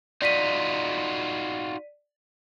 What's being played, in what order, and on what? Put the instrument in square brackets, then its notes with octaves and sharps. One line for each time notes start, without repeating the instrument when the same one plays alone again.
[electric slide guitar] D#4 F4 F#4 [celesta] D5 B6 D#7